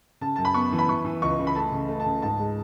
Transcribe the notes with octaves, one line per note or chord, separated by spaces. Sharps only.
C#3 A5
F#2 A5
B5
B3 C#6
E3
B5
E3 C#6
E3
C#2 C#6
C#3
B5
A3 A5
C#3
A3
A5
C#3
G#2 A5
G#3